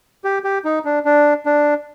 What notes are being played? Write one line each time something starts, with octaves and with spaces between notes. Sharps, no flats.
G4
G4
D#4
D4
D4
D4